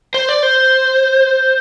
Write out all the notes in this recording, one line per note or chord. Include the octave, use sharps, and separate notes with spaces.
C5
D5
C5